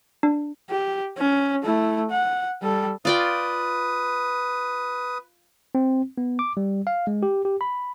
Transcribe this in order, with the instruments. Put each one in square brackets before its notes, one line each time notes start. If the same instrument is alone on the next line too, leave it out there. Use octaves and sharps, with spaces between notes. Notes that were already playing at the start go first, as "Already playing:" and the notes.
[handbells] D4
[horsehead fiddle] G4
C#4
A3 E4
F#5
G3 A4
[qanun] F4 D5 G5 [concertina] B4 [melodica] D#6
[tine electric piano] C4
B3
D6
G3
F5
G#3
G4
G4
B5